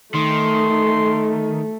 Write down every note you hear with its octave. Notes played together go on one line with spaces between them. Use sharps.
D#3 A3 C6